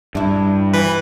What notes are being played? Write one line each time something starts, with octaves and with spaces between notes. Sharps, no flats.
G2 D4 E4
E3 B4